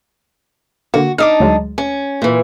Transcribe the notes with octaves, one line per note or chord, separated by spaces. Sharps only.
D3 A#3 F#4
D4 D#4 D6 D#6 F6
D2 F#3 G#3
C#4
A#2 E3